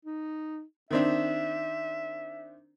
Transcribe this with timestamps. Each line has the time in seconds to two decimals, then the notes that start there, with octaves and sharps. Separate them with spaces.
0.05 D#4
0.91 D#3 C4 D4 E5